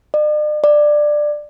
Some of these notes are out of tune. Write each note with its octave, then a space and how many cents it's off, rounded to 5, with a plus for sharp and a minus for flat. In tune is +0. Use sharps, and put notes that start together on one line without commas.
D5 +45
D5 +15